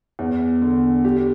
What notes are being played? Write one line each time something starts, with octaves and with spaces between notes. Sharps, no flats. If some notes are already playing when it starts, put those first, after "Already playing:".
E2
D3
G4